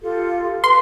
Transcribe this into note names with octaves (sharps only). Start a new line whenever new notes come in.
F4 G4 A4
B4 C6